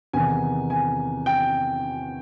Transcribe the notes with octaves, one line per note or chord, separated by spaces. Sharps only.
E2 C3 D#3 G#5
G#5
G5